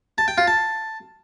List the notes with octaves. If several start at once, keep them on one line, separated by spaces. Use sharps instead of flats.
A5
G5
F4
A5